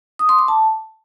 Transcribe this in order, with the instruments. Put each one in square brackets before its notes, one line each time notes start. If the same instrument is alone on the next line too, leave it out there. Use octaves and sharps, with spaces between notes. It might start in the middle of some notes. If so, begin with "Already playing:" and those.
[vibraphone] D#6
C6
D6
A5